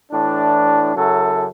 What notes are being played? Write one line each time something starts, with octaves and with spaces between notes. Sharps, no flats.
A2 E3 D4
F#2 C#3 F#3 E4 A4